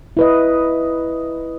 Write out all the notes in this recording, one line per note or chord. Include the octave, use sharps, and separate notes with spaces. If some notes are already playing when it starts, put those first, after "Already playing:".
E4 B4 D#5